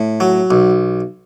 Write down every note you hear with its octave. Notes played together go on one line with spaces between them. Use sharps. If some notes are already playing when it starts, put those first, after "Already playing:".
Already playing: A2
F#3
B1